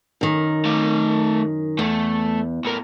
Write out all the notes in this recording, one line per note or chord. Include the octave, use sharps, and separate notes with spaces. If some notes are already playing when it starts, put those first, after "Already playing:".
F#2 D#3
A3 F5
E2 A3
A2 A#4